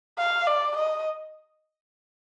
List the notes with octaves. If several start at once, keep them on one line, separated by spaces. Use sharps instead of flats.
F5
D5
D#5